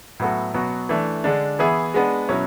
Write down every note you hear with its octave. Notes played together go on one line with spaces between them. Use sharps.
A2 F#3 B3 F#4 A4
B2 F#3 B3 F#4
E3 A3 D4
D3 G#3 D4
E3 B3 E4 G#4
G#3 B3 D4
B2 F#3 C#4 E4